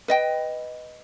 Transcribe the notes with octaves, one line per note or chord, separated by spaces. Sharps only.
B4 D#5 G5